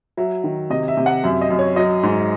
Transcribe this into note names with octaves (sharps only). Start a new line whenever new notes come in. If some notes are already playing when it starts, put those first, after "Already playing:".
F#3 E5
D#3
C3 D#5
E5
C3
F#5
F#2 E5
D#5
F#2
C#5
F#3 D#5
G#2